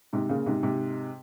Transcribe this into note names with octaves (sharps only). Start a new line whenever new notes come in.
G#2 C3
A#2 C#3
G#2 C3
G#2 C3